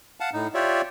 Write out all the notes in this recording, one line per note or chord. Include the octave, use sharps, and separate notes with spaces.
F5 F#5 A5
A2 D#4
F4 G4 C#5 D5 E5